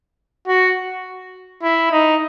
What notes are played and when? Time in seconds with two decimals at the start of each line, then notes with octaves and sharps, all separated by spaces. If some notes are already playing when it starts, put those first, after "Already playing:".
0.48 F#4
1.62 E4
1.91 D#4